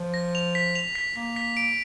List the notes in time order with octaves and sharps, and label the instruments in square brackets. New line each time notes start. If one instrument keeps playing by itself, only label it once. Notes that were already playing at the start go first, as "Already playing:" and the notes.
Already playing: [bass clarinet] F3
[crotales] A#6
F7
B6
F7
B6
[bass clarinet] A#3 [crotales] B6
[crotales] B6
D7